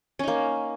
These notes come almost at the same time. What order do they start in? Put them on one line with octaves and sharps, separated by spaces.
C#4 D#4 A#3